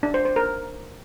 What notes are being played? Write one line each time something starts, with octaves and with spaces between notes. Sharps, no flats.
D4
C5
C5
A#4